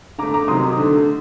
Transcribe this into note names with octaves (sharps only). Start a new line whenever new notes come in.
D3 A3 A#5 D6
A#5 D6
C3 D#3 F#3 C6 D#6
D3 A3